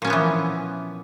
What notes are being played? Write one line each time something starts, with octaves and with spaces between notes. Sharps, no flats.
A#2 E3 F3 B3 C#4